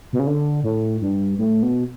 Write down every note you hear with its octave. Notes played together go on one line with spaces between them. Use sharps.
B2
C#3
D3
A2
G2
A2
B2